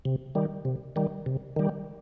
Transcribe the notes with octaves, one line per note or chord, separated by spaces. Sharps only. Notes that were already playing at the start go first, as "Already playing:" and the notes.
C3
D#3 G3
C3
D#3 G3
C3
D#3 G3